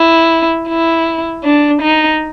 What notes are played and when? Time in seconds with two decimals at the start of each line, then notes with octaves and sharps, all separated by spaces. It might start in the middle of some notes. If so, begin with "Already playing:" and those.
Already playing: E4
0.69 E4
1.44 D4
1.82 D#4